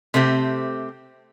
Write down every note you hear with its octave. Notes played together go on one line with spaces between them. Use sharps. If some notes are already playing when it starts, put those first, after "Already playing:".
C3 A3 C4 G4